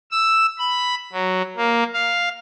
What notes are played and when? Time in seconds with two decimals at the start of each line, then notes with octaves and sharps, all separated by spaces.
0.11 E6
0.59 B5
1.12 F#3
1.56 A#3
1.93 F5